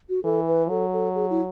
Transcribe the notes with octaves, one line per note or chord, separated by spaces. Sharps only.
F#4
E3 A4
B4
F#3 A4
A4
G#4
E4